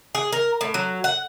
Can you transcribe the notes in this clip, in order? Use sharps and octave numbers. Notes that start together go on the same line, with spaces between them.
G#4
A#4
A2
F#3
F#5